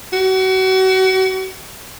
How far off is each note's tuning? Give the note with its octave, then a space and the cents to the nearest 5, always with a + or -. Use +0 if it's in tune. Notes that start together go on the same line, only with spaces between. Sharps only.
F#4 +30